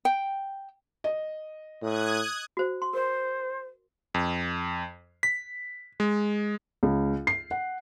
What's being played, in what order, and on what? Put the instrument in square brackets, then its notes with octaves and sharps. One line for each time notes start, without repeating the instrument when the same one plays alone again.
[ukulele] G5
[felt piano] D#5
[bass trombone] A2 [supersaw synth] D#6 F#6 G#6
[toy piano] F#4 C5
C6
[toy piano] A#4 C#5 [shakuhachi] C5
[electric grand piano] F2
B6
G#3
[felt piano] C#2
C7
F#5